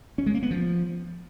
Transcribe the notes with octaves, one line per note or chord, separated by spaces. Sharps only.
C#4
G#3
A#3
B3
F3